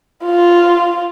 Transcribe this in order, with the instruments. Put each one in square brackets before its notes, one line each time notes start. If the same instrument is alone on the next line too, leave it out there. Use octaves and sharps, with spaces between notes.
[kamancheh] F4